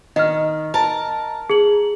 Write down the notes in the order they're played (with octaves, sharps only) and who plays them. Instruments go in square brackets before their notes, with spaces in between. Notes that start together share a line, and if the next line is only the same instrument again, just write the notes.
[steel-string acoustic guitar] D#3 [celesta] D#5 F6
[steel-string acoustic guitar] A#4 A5
[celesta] G#4 F#7